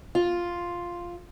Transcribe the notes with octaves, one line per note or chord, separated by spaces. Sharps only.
F4